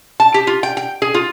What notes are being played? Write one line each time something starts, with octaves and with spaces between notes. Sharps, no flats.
A5
G4
F4
G5
G5
G#4
F4